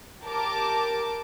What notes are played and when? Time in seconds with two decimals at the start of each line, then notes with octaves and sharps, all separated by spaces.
0.23 G4 A#4 A5 D6